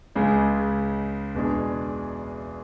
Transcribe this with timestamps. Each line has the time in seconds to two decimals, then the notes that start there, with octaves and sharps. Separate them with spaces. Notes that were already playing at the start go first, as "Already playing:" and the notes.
0.15 C#2 C#3 G#3
1.35 E2 B2 G#3 D4 G#4